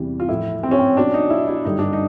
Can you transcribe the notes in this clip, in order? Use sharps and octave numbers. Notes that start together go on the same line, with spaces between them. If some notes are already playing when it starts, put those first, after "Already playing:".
Already playing: E2 C3 E3 G3
F4
A2 F3 E4
C4
C#4
C4
B2 F#3 D4
D#4
E4
E4
G2 D3 G3 D#4
D4
D#4